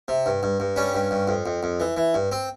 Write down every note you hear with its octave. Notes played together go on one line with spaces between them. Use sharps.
C3
G2
G2
G2
G3 C#4
G2
G2
F2
F2
F2
E3
E3
G2
C4